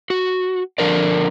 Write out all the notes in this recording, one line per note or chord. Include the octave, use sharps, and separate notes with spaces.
F#4
D3 F3 D4 A#4 D5